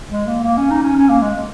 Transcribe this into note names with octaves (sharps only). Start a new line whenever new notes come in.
G#3
A#3
A#3
C#4
D#4
C#4
C#4
A#3
G#3